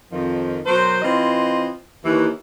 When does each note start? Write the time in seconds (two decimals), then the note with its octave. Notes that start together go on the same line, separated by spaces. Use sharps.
0.11 F2 D#3 F3
0.66 B2 F#3 A#4 C5
1.02 E3 C4 F4 B4 C5 D#5
2.04 D#2 E3